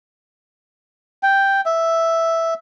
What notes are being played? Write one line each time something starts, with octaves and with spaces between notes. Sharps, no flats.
G5
E5